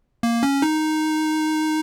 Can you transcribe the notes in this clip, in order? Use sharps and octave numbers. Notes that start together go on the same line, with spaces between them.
A#3
C#4
D#4